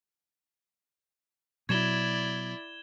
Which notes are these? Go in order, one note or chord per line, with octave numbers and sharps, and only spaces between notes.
B2 F#3 E4 D5 G#6 E7 G7